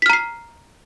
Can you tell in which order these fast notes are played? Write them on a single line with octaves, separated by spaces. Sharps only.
B6 F6 A#5 C7